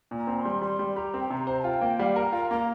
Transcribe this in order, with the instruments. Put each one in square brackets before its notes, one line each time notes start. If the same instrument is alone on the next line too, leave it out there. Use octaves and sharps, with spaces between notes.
[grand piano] A#2
[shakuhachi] A#5
[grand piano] C4
[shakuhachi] C6
[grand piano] G3
[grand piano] G3 [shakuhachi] C6
[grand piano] G3
[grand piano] G4 [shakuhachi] A#5
[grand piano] C4
[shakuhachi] G5
[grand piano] C3 [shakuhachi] A#5
[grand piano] C5
[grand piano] F4 [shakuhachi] G5
[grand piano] A#3
[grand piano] G3 [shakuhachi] F5
[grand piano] A#4 [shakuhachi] A#5
[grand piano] F4 [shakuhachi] A#5
[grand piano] A#3 [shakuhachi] A#5